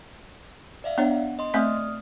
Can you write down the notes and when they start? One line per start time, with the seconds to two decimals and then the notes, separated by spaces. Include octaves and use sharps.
0.84 D5 E5 F5
0.98 B3 D4 C#5 F#5
1.39 D#5 C6
1.54 A3 C4 D5 E5 D#6 F6